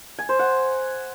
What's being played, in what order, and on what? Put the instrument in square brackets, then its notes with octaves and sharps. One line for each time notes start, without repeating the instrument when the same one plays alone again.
[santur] G#5
C5
F#5